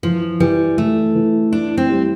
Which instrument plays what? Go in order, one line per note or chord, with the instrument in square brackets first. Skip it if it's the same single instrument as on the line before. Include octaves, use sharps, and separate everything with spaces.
[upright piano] E3 [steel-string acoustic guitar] F3
[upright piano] E3 [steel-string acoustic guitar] G3
[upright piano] E3 [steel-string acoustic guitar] A3
[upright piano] E3
[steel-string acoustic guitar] D4 [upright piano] E4
[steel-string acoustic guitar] C4
[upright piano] G3